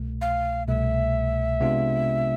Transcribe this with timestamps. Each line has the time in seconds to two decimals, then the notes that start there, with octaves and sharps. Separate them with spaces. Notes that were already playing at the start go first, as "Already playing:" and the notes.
Already playing: C2 B2 A3
0.21 F5
0.68 C2 B2 A3 E5
1.60 C3 G#3 B3 D4 F4